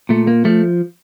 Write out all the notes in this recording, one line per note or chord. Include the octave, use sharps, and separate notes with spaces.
A#2 A3
A#3
F3 A3